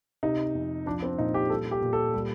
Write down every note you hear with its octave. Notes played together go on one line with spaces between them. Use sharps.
C3 D#4
F2
F3 D4
C4
A#2 D#4
G4
G3 A4
G4
A#2
A4
G3